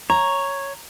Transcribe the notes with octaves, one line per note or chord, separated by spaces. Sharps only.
C#5 A#5